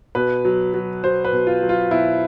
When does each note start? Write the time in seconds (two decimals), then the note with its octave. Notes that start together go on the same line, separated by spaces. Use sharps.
0.15 B2 B4
0.45 F#3
0.74 F#3
1.04 F#3 C5
1.25 B4
1.32 B2
1.47 F4
1.62 F#3
1.69 F4
1.91 B2 E4